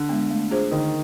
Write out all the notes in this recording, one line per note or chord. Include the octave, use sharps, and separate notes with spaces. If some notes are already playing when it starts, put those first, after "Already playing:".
Already playing: D3
G#3 B3
A3
D4 F4 G#4 C5
D3 D#3